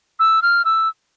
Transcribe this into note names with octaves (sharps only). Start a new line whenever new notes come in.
E6
F6
E6